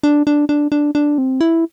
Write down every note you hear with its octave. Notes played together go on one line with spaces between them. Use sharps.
D4
D4
D4
D4
D4
C4
E4